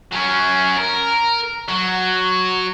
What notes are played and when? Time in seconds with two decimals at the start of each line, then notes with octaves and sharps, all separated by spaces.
0.12 F#3 C#4
0.77 A#4
1.68 F#3